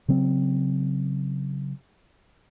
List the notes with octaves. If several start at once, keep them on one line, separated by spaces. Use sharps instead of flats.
C#3 F#3 C4